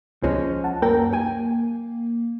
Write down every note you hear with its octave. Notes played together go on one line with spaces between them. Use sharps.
C#2 F3 G#3 C#4
F#5 A5
F#2 A#3 A#4 G5
G5 G#5